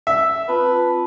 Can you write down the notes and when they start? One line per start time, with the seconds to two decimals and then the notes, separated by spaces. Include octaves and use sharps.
0.07 E5
0.48 C4 F4 B4 A5